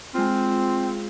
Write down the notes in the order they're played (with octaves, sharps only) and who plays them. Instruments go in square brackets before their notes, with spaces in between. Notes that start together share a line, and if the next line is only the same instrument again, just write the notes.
[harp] G#3 F4 [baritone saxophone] C4